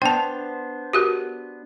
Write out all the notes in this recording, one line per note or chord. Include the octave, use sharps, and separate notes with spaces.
B3 D4 C5 G5 A5
F#4 G4 A#4